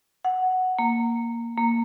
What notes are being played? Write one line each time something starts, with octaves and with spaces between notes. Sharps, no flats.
F#5
A#3
A#3